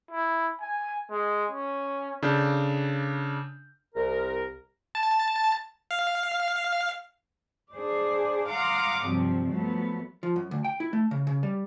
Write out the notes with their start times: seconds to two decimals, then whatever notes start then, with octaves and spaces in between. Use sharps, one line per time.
0.11 E4
0.61 G#5
1.10 G#3
1.51 C#4
2.22 C#3 D4 A4 G6
3.95 C2 A#4
4.95 A5
5.91 F5
7.74 D4 G#4 C5 D5
8.47 F5 F#5 A#5 C6 D6 D#6
9.04 G2 C3 F3 F#3
9.49 F3 F#3 A3 B3
10.23 F3
10.36 F#2
10.51 D2
10.64 G5
10.80 E4
10.93 A3
11.11 C#3
11.27 C#3
11.43 G3